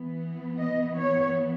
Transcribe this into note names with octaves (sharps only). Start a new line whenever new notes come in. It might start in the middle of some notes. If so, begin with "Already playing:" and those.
Already playing: E3 B3
D#5
C#5